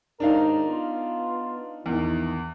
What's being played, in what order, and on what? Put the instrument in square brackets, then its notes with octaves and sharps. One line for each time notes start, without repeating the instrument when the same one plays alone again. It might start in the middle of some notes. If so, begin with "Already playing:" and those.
[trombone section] D#2 G#2 A#4 [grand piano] D4 D#4 F5
[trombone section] B3 F4
[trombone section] A#1 D#3 [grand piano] E2